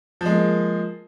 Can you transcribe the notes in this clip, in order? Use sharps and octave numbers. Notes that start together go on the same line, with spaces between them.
F3 G#3 A#3